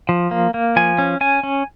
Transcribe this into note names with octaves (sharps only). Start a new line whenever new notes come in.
F3
A#3
A#3
F3 G#5
C#4
C#4 G#5
C#4